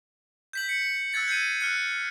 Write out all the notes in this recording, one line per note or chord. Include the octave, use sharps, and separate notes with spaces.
G6 B6 F#7
C#7
E6 F#6 G#6 A6 C#7
G6 G#6 C7 D#7
F6 F#6 C#7